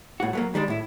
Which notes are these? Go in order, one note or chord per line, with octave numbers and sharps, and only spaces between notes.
A2 F#4
F#3 A3 A#3
D#3 G3 G#3 D4
A2 E4